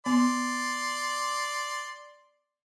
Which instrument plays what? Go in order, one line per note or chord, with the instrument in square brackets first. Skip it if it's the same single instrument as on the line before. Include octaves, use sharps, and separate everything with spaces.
[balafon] B3 [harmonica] D5 C6